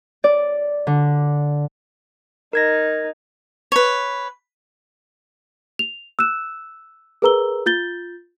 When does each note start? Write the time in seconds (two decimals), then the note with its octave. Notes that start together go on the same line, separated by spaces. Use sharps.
0.24 D5
0.87 D3
2.53 D#4 A#4 G#6 A#6
3.72 B4 C#5
5.79 F7
6.19 E6 F#6 E7
7.22 G#4 A#4 B4 A#5 E6 G7
7.66 F4 G6 A6 G7